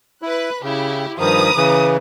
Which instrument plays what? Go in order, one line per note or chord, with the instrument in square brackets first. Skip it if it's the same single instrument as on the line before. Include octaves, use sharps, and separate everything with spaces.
[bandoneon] E4 [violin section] B4 F#6
[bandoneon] C#3 [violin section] E4 G4
[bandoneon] G2 D#3 F3 [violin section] B4 A#5 D#6
[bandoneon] C#3 E3